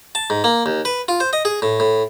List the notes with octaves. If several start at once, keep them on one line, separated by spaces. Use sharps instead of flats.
A5
G#2
A#3
D#2
B4
F4
C5
D#5
G#4
A2
A2